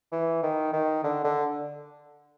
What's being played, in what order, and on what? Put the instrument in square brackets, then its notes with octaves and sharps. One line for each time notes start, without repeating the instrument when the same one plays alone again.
[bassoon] E3
D#3
D#3
D3
D3